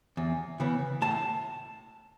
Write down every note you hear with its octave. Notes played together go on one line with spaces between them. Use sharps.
E2
C#3 E3 B3
A2 A5